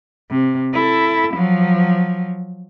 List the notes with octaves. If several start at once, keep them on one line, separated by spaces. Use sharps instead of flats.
C3
E4 A4
F3 F#3